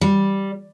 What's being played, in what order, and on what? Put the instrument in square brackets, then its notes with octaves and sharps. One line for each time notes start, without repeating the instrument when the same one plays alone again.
[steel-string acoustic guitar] G3